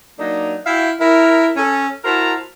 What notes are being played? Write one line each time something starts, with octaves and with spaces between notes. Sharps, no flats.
F#3 A#3 D4 D#4
E4 F#4 E5 F5 G5
E4 A#4
C#4 A4
E4 F#4 A#4 C5 A5 A#5